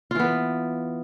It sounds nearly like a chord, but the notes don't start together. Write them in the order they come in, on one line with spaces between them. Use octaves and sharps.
F4 E3 B3